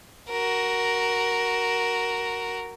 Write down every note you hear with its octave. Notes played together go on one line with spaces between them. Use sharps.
F#4 A#4